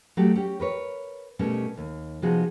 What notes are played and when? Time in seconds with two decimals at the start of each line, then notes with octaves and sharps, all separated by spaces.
0.17 F#3 G3 A3 G4
0.36 C#4 G4
0.60 A#4 B4 C#5
1.39 B2 G3 A3 C#4 A#4
1.77 D#2
2.22 C3 F3 B3 D#4 F#4 G#4